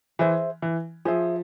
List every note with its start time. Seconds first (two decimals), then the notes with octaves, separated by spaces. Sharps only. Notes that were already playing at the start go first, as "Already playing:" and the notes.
0.19 E3 G#4 C5 E5
0.62 E3
1.05 F3 G#4 C5 E5